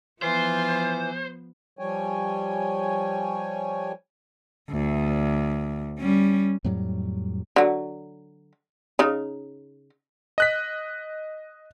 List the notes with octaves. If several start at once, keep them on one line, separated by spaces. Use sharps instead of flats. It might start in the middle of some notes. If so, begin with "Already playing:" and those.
E3 F3 B3 F4 C5
F3 G3 C#5 G5 G#5
D2
G3 C#4
F2 A2 F#3 G3
D3 F#3
C#3 D#4
D#5 F#6 B6